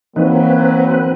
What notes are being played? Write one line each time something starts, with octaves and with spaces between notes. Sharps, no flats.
E3 F#3 A#3 C4 D#4 B4